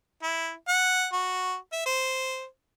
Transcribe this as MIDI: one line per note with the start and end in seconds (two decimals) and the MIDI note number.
0.23 0.53 64
0.68 1.07 78
1.13 1.56 66
1.72 1.82 76
1.86 2.45 72